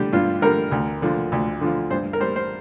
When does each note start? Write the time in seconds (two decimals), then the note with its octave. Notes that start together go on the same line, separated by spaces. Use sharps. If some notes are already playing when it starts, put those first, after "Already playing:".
Already playing: D3 G3 D4 G4
0.13 G2 F4
0.42 D3 G3 A#4
0.71 D2
1.02 D3 F3
1.32 D2
1.61 D3 F3
1.90 G2 C5
2.13 A#4
2.20 G3 C5
2.36 C5